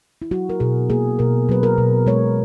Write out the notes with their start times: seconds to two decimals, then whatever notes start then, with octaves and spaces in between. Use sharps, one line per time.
0.22 E4
0.31 F#3 F#4
0.49 A#4
0.60 B2 G#4
0.90 A#3 G#4
1.19 B2 A#4
1.49 F#3 B4
1.63 A#4
1.78 B2
2.07 G#3 C#5